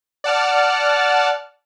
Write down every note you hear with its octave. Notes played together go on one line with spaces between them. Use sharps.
D5 F#5 A5 F6